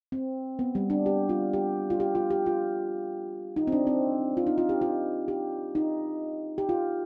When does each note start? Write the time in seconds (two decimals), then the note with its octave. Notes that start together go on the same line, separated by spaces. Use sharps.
0.12 C4
0.59 B3
0.75 G3
0.90 D4
1.06 G4
1.29 F4
1.53 G4
1.90 F4
2.00 G4
2.15 F4
2.30 G4
2.46 F4
3.56 D#4
3.67 C4
3.72 D4
3.87 C4
4.37 F4
4.47 D#4
4.58 F4
4.69 G4
4.81 F4
5.28 G4
5.75 D#4
6.58 G4
6.69 F4